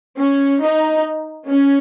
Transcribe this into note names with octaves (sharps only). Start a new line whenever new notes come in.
C#4
D#4
C#4